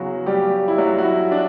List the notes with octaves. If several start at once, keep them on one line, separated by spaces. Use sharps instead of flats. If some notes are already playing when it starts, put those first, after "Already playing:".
Already playing: E2 C#3 F#3 B3 F#4
G3 G4
E4
F#3 F#4
F#4
E4
D4